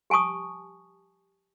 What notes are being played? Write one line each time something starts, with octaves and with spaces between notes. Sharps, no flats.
G4 G#5 A5 C#6 D#6